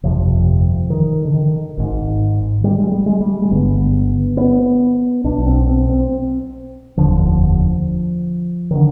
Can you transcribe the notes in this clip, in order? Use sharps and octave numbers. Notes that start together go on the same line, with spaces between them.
G1 F2 C3 F3
D#3
D3
D#3
G#1 G#2
G3
G#3
G3
G#3
G3
G#3
G1 G2 D3 B3
B3
B1 B2 D4
C4
C4
C4
F1 D#2 D3 F3
D3 D#3